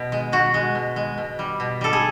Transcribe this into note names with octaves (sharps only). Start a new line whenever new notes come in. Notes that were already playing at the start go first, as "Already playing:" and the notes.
Already playing: B2
G#3
B2 F#4
G#3
B2
G#3
B2
G3
B2
G3 A4
G#4